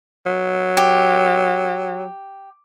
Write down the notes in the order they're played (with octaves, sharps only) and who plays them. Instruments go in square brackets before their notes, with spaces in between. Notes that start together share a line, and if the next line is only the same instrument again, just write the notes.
[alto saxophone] F#3
[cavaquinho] G4